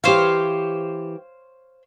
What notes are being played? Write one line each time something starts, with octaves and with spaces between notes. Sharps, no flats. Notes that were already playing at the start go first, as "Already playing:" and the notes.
E3 G4 C5 C#5 F5